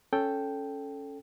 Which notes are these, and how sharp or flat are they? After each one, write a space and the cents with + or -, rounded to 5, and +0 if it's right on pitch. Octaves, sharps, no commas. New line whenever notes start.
C#4 +0 A4 +0 G5 +0